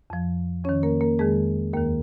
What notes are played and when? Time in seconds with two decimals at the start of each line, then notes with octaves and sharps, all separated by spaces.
0.10 F2 F3
0.64 F2 D#3 C#4 C#5
0.83 A#3 A#4
1.01 A#3 A#4
1.19 F2 D#3 G#3 G#4
1.73 D#2 D#3 A#3 A#4